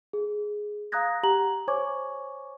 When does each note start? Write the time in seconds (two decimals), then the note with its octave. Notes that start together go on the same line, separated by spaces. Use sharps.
0.13 G#4
0.92 F5 A#5 D#6 F#6 G#6 A#6
1.23 G4 F#5 A#5 F#7
1.68 C5 C#5 G#5 C#6 D6 G#6